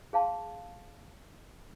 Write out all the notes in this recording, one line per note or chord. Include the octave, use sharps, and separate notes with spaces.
G#4 F5 A5 C6